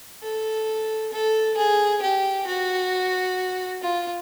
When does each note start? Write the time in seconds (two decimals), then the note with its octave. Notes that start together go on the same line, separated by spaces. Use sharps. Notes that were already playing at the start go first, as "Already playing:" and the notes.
0.22 A4
1.12 A4
1.57 G#4
2.02 G4
2.47 F#4
3.82 F4